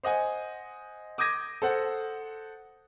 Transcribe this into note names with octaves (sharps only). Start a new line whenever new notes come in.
C5 D#5 F#5 G#5
D6 D#6 G6 G#6 A#6 D#7
A4 C5 F#5